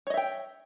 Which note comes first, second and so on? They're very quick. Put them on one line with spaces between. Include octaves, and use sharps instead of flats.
C#5 D#5 E5 G5